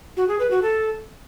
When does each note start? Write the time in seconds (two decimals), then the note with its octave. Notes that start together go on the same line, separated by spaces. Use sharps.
0.17 F#4
0.28 G#4
0.39 B4
0.51 F#4
0.62 A4